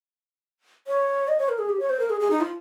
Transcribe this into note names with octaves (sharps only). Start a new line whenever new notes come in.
C#5
D#5
C#5
A#4
G#4
G4
C#5
C5
A#4
G#4
G#4
D#4
F4